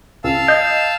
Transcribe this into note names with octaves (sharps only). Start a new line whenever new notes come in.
C#2 F5 A5 E6
D#5 G6